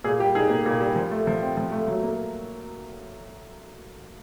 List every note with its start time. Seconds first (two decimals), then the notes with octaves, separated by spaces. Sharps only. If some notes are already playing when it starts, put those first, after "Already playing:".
0.04 A#2 G#4
0.20 G3 G4
0.35 D#4 G#4
0.50 A#3
0.66 A#2
0.81 G3
0.96 F3
1.11 A3
1.27 F3
1.42 C4
1.57 F3
1.72 A3
1.88 F#3
2.03 A#3